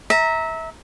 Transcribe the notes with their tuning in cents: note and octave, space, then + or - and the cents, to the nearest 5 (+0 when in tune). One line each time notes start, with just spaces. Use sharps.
E5 -25 A#5 -10